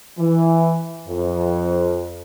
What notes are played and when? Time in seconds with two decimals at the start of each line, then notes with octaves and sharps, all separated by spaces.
0.19 E3
1.08 F2